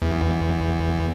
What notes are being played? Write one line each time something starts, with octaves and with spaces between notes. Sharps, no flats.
E2